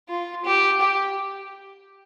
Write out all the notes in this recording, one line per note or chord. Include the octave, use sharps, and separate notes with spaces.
F4
G4
G4